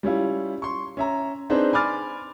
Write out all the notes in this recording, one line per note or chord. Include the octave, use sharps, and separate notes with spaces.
G3 C#4 E4 F4
C6 C#6
C#4 E5 A#5
C4 D4 D#4 G#4 B4 C5
G#5 B5 C6 D6 F6 A6